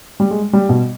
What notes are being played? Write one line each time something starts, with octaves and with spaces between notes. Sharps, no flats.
G3
G#3
G3
B2